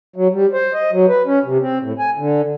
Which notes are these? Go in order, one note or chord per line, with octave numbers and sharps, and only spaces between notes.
F#3
G3
C5
D#5
F#3
B4
C#4
C3
C4
A2
G#5
D3